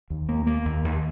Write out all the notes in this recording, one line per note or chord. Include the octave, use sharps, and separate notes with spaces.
D#2
A#3
A#3
D#2
D#2